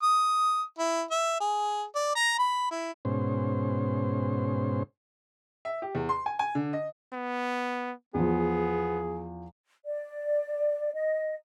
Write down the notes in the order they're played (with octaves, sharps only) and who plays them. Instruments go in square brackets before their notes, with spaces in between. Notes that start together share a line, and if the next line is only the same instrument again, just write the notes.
[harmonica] D#6
E4
E5
G#4
D5
A#5
B5
E4
[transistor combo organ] G#2 B2 C#4 C5
[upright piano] E5
G4
E2
C6
G#5
G#5
D3
D#5
[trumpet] B3
[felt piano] E2 F3 [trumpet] B3 [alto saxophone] G#4
[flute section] D5
D#5